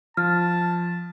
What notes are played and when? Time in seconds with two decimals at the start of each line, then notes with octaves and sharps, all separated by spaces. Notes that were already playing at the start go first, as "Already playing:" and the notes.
0.17 F3 A5 F6